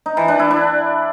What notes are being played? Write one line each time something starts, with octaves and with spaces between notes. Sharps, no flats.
D#4
E3
D4
E4
D4